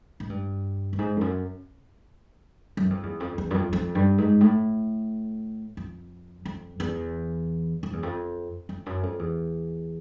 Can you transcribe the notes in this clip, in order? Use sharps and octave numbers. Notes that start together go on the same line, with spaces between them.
G#2
G2
G2
G#2
F2
F#2
F#2
F2
E2
F2
E2
F#2
F2
F2
G2
G#2
A2
F2
F2
E2
F2
E2
F2
F2
F#2
F2
E2